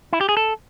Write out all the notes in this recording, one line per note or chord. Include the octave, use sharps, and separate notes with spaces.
E4
G4
G#4
A4